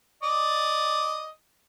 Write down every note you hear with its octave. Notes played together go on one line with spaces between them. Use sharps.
D5 D#5